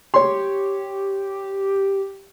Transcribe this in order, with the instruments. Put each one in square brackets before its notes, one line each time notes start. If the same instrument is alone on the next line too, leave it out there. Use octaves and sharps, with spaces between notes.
[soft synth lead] G4 [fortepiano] C#5 C6